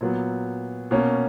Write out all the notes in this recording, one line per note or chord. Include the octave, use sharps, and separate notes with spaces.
A#2 F#3 B3
B2 A#3 C#4